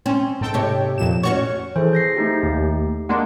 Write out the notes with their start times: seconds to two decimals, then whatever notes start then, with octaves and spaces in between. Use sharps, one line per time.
0.06 C4 C#4
0.41 G#2 A4 G5
0.54 C3 G4 C#5
0.98 F2 A#2 E7
1.23 C#4 F#4 C#5 C#6
1.76 E3 G#4 A4 C5
1.93 G6 A#6 C7
2.16 A3 D#4 G4
2.43 D#2
3.09 G#3 A#3 D4 F#5 C6